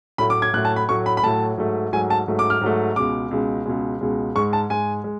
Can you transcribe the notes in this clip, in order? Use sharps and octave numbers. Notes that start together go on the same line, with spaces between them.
A2 F#3 A3 B5
D6
G#6
A2 F#3 A3 F#6
A5
B5
A2 F#3 A3 C#6
B5
B5
A2 F#3 A3 A5
G#2 F#3 A3
G#2 F#3 A3 G#5
A5
G#2 F#3 A3
D6
F6
G#2 F#3 A3
C#2 B2 G#3 D6
C#2 B2 G#3
C#2 B2 G#3
C#2 B2 G#3
G#2 G#3 C#6
A5
G#2 G#3 G#5
G#3